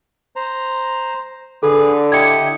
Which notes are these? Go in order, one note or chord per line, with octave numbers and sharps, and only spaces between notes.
C5 A#5
D3 G#4 A4 B4
E4 G4 D#5 G#6 C#7